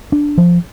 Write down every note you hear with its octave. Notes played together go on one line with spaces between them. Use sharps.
D4
F3